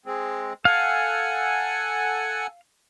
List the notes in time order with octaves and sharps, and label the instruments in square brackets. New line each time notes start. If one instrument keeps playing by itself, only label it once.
[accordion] G#3 C4
[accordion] A4 F#5 G#5 [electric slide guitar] F5